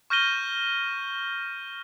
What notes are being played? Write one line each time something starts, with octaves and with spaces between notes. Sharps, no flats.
C#6 F6 G6 A#6 D#7 G7